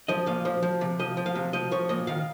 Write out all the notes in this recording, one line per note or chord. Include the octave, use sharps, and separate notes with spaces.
F3 D#5
A#2 F5
F3
F3
C3
F3 D#5
F3
F5
C3
F3 D#5
F3 C#5
A#2 D#5
D#3 F5